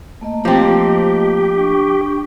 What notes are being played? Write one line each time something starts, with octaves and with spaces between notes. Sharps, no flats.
A3 A#3 D#5
F3 C4 G4
D4 C#6